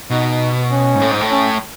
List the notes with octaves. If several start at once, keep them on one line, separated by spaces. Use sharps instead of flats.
B2 D#4
C#4
G#2
A2
G#2
A2
C#4